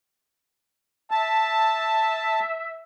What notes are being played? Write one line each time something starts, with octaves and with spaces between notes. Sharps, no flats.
E5 A5